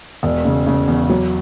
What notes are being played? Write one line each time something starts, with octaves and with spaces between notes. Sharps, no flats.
E1
C#3
C#3
E2
F#3